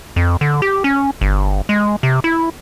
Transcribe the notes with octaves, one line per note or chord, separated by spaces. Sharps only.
F2
D3
G4
C#4
G1
G#3
C3
E4